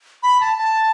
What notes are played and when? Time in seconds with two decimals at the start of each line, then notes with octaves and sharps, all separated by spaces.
0.23 B5
0.41 A5
0.58 A5